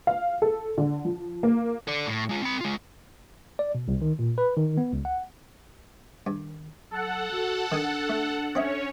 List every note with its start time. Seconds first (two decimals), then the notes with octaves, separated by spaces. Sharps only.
0.07 F5
0.42 A4
0.78 D3
1.05 F3
1.43 A#3
1.88 A4 D5
2.07 A2
2.29 G#3 F4
2.42 C4 B5
2.61 G#3 F4
3.59 D5
3.75 B2
3.88 C2
4.02 D#3
4.19 A#2
4.38 B4
4.57 D#3
4.78 B3
4.93 C#2
5.05 F#5
6.27 G2 D#3
6.91 F#3 A4 F#5
7.31 F#4
7.72 D#3 D4 G#5 D#6
8.09 A3
8.55 C4 C#4 C#5 D#5 E5